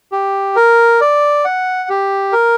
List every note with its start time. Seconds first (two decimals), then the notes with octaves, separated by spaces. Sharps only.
0.12 G4
0.56 A#4
1.01 D5
1.45 F#5
1.89 G4
2.32 A#4